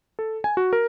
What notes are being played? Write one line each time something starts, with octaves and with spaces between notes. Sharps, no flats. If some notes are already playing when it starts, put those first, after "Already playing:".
A4
G#5
F#4
A#4